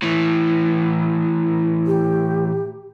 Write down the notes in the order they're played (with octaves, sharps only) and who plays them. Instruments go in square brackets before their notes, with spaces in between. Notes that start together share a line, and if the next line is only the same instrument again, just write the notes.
[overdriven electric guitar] A2 E3
[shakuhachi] G4